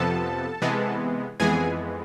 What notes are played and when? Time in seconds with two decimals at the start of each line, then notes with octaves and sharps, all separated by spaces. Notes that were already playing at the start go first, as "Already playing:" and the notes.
Already playing: F2 C3 F3 B3 A4 A5
0.62 C3 E3 G#3 B3
1.40 F2 E3 G#3 B3 G#4 G#5